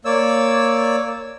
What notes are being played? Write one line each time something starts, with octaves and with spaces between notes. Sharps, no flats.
A#3 C#5 D5 E6